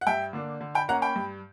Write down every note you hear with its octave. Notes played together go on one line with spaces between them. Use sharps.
F#5
G2 E5 G5
D3 A#3 D4
D3
G5 B5
A#3 C#4 F#5 A#5
G5 B5
G2